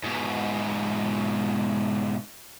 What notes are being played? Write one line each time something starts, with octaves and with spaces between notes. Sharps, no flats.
G#2 B2